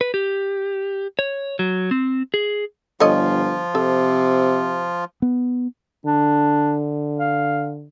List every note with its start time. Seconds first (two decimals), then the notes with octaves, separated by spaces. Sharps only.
0.01 B4
0.14 G4
1.19 C#5
1.59 F#3
1.91 C4
2.34 G#4
3.00 G1 F3 F4 A4 C#5 D#5
3.75 C3 A4
5.22 B3
6.06 D3 D4
7.20 F5